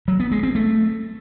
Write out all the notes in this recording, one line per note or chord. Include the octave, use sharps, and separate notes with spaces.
F#3
B3
G#3
C4
A3